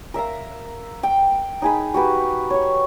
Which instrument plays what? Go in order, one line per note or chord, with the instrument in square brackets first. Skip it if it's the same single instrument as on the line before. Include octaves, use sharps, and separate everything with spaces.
[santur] A#4 E5 F5 A#5
G5
D#4 G#4 B5
F#4 G4 B4
C#5 C#6